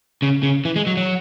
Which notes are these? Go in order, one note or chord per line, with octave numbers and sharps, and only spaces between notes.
C#3
C#3
E3
G#3
F#3
F#3